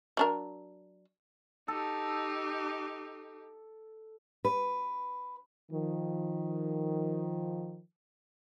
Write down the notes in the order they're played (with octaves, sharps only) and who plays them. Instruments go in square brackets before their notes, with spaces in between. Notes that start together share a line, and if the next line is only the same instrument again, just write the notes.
[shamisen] F#3 D4 A#4
[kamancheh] D#4 G4 [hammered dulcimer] A4
[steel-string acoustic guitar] B4
[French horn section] D#3 F3